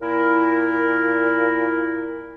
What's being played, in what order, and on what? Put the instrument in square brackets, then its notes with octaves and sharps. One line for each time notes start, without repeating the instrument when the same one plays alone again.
[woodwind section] A#2 E4 A#4